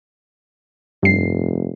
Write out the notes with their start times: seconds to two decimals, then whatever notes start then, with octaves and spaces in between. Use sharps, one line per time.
1.03 F1 G2 C7